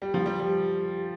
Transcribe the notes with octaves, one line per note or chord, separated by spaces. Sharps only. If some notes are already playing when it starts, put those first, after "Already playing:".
G3
F3
G3
G3